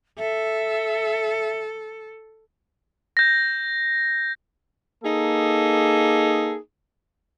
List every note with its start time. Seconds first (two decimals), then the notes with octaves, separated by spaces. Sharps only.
0.18 A4 E5
3.17 G6 A#6
5.04 A#3 D#4 G#4 A4